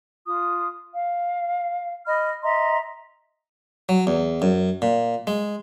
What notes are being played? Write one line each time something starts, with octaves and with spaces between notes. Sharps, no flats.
F4 D#6
F5
D#5 B5 F6
D#5 E5 A#5 C6
F#3
E2
F#2
A#2
G#3